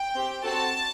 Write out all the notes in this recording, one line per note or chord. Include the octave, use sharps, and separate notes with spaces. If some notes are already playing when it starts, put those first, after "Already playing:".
Already playing: G5
C4 G4
C4 F#4 A4 A5